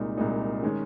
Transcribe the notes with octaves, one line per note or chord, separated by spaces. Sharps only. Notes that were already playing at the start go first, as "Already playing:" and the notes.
Already playing: C2 A#2 G#3 D#4
C2 A#2 G#3 D#4
D#3 G#3 C#4